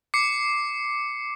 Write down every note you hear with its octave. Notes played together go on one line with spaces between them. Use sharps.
D6 C7 C#7